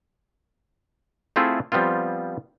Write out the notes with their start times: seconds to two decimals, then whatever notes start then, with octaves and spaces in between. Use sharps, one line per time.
1.36 A3 C4 E4 F4 G#4 A4
1.72 F3 G3 B3 C4 F4